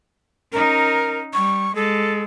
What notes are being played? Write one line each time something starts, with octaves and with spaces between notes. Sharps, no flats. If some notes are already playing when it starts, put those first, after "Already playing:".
C#4 D#4 A#4
G3 C#6
G#3 A4